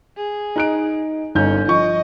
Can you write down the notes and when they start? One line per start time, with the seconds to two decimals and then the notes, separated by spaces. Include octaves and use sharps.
0.17 G#4
0.56 D#4 F#6 D7
1.35 G1 C#4 D#4 G6
1.68 F3 D#5 C#6